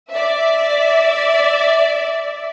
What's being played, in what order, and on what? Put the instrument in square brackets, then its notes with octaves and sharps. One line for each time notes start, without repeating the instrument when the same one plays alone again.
[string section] D5 E5